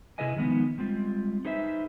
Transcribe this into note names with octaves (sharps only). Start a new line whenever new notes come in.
C3 E4 G#4 B4 D#5 G#5
D#3 F3 G#3 B3 D#4
G3 G#3 C4 F4
D#4 G#4 B4 C5 E5